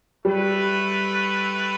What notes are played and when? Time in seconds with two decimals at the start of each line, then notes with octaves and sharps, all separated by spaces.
0.25 G3 A3 E4 B4